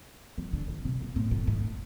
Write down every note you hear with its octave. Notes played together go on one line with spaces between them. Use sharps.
E3
D3
C#3
C3
A#2
A2
A2
G#2